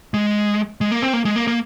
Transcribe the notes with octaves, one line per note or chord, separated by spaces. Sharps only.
G#3
G#3
A#3
C4
A#3
G#3
A#3
A#3